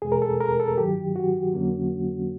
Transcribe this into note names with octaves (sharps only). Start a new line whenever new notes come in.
E2 B2 G#3 G#4
A#4
A4
A#4
A4
G2 D#3 F#3 G4
F#4
F2 D3 F#3 A#3 C#4